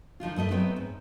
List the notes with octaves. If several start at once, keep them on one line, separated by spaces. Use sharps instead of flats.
D#3 F3 D4 F4
G2 A3 D#5 E5
F#3 A3 B3 C4 B4 G5
G#2